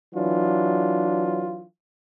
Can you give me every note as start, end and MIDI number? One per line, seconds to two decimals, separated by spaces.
0.14 1.63 52
0.14 1.63 54
0.14 1.63 62
0.14 1.63 65